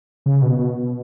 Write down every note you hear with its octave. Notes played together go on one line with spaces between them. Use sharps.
C#3
B2
B2